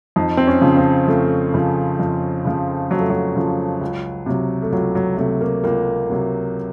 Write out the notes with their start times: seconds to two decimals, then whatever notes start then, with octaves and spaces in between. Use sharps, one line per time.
0.16 F2 D#4
0.37 C4
0.47 C#4
0.62 C#3 F3
0.77 C4
1.07 F2 A3
1.54 C#3 F3
2.00 F2
2.45 C#3 F3
2.91 F2 F#3
2.99 A3
3.10 F#3
3.35 C#3 F3
3.81 C#2
4.26 C3 F#3
4.62 A3
4.72 C#2 F#3
4.95 F#3
5.17 C3 F#3 A3
5.41 A#3
5.64 C#2 A#3
6.10 C3 F#3